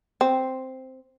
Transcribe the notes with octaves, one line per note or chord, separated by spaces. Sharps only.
C4